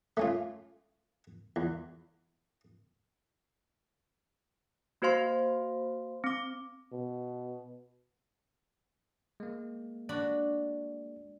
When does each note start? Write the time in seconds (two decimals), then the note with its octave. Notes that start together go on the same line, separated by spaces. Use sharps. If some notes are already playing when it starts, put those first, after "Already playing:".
0.17 A3 C#4 F4
1.56 E2
5.02 A#3 F#4 C5 F5 C6
6.24 C4 D6
6.92 B2
9.40 G#3 A#3
10.09 D4 F#4 B5